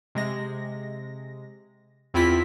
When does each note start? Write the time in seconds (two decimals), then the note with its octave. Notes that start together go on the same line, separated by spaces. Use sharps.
0.15 C3 G#3 A#6
2.14 E2 C4 E4 F4 B6